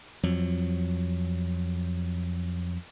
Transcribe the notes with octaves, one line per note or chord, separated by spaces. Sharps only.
F2 F#3